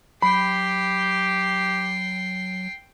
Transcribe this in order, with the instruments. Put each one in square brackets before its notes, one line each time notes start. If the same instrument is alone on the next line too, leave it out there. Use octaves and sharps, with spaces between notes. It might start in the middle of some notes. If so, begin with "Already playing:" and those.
[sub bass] F#3 [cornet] G4 [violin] G5 C7 [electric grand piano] B5